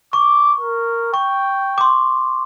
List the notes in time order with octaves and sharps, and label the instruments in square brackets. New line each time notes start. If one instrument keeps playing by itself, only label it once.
[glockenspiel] C#6 [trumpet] D6
[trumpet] A#4
[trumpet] G5 [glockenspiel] C#6
[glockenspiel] C6 D6